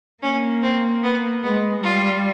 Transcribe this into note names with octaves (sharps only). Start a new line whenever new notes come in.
A#3 C#4
C4
B3
G#3 B3
G3 F4